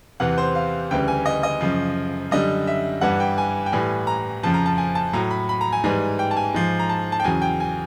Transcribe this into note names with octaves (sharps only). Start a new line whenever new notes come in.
E2 C3 E3 F#5
C5
F5
D2 C#3 E3 G3 G5
G#5
D#5
D#5
F#2 C#3 F3
F#2 D3 G3 D#5
E5
G2 E3 G3 F#5
G5
G#5
G5
A2 E3 G3 G#5
A#5
F2 C#3 F3 A5
A#5
A5
G#5
A5
A2 F#3 A#5
B5
B5
A#5
G#5
G#2 E3 G3 G#5
G5
A5
G#5
G#2 F3
A#5
A5
A5
G5
E2 C#3 F#3 G#5
G5
G#5